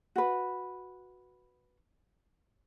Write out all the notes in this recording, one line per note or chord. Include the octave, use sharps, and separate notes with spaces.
F#4 B4